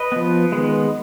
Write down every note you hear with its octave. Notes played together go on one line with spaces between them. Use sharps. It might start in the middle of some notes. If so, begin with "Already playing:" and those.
Already playing: B4 D#5
F3 B3
D#3 G#3 B3